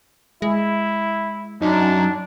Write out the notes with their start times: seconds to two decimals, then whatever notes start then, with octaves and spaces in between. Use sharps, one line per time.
0.42 G#3 E4
1.62 F#2 D4 D#4